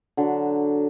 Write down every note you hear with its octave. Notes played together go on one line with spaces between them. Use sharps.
D3 F#3